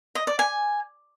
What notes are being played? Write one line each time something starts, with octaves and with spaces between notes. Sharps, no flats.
D#5
D5
G#5